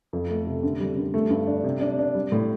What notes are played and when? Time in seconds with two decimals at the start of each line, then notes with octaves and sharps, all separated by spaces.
0.13 F2
0.30 A3
0.47 C3
0.63 D3
0.80 G3
0.97 D3
1.14 A3
1.30 G2
1.47 D4
1.64 C3
1.81 D4
1.99 D4
2.15 G3
2.32 A2